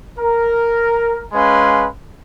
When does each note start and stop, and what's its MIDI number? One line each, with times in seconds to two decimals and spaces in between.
0.19 1.24 70
1.33 1.87 56
1.33 1.87 61
1.33 1.87 71
1.33 1.87 77
1.33 1.87 80
1.33 1.87 84